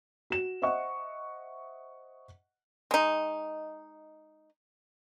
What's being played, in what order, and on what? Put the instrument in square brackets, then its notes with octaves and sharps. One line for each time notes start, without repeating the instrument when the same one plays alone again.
[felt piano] F#4 E7
C5 D#5 E5 F#5 C#6
[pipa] G#3 D#4